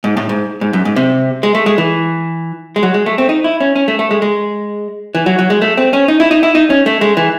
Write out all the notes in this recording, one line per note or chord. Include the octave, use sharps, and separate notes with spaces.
G#2
A2
G#2
G#2
F#2
G#2
C3
G#3
A3
G#3
E3
G#3
F#3
G#3
A3
C4
D#4
E4
C#4
C#4
A3
A3
G#3
G#3
E3
F#3
F#3
G#3
A3
C4
C#4
D#4
E4
D#4
E4
D#4
C#4
A3
G#3
E3